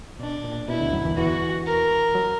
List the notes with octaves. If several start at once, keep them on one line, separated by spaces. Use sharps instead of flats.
B2 D4
A#2
B2 E4
D2 D3
F#2 F#3
E2 E3
E2 E3 F#4
A#4
F#3